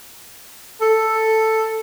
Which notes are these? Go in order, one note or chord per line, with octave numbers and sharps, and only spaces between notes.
A4